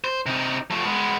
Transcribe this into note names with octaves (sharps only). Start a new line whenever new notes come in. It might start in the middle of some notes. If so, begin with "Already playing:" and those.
C5
C3 D#4
F3 A3
G#3 B3